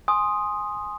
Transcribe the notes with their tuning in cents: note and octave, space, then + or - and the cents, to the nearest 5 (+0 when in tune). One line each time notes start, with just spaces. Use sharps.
G#5 +0 C6 +10 D#6 +0